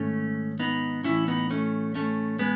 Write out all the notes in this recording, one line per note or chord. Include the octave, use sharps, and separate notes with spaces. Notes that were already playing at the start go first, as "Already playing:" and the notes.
Already playing: G#2 D#3 A3 C#4
B3 D#4
A2 E3 C#4 E4
B3 D#4
A3 C#4
A3 C#4
G#3 B3